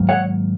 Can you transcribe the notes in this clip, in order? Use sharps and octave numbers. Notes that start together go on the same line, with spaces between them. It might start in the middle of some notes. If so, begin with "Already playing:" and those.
Already playing: G#2 D#3 F#3 A#3
C#5 F#5